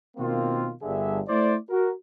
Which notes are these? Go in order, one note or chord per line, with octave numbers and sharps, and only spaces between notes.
B2 D#3 A#3 C4 F4
G1 G2 D3 G#4 E5
A3 E4 C5 D5
F#4 A#4